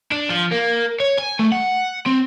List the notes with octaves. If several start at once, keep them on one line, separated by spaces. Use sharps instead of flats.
D4
F3
A#3
C#5
G#5
A3
F#5
C4